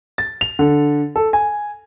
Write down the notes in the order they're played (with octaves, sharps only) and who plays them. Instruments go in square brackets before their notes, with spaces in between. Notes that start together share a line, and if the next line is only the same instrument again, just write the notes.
[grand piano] A6
F7
D3
A4
G#5